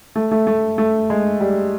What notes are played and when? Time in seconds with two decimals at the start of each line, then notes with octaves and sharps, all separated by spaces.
0.16 A3
0.31 A3
0.47 A3
0.78 A3
1.10 G#3
1.40 G3